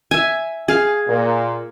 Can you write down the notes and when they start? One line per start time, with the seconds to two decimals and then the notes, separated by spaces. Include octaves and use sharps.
0.11 E5 G#5
0.68 G#4 F5
1.07 A#2